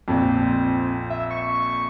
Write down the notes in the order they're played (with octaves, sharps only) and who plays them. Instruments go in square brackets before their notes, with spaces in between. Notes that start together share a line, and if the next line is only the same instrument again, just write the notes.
[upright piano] A#1 F2 [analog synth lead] C4
[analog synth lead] E5
C#6